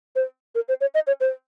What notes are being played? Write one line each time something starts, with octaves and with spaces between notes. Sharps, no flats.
C5
A#4
C5
C#5
D#5
C#5
C5